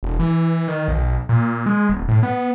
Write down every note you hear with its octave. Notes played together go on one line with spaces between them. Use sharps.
E1
E3
D#3
B1
A#2
G#3
D#1
A2
B3